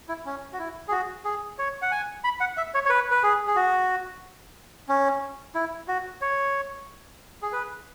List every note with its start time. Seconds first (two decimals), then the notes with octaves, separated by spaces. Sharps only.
0.09 E4
0.26 C#4
0.53 F#4
0.59 E4
0.88 G#4
0.91 F#4
1.25 G#4
1.59 C#5
1.82 F#5
1.92 G#5
2.24 B5
2.40 F#5
2.57 E5
2.74 C#5
2.86 C#5
2.90 B4
3.11 B4
3.23 G#4
3.47 G#4
3.56 F#4
4.89 C#4
5.55 E4
5.88 F#4
6.21 C#5
7.42 G#4
7.53 B4